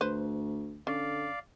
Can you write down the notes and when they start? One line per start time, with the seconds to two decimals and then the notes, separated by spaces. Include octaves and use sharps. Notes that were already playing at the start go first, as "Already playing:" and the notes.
0.01 D2 B4 C5
0.87 D3 C#4 D5 F5